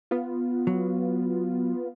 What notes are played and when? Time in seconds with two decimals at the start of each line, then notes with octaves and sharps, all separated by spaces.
0.11 B3 F4
0.67 F#3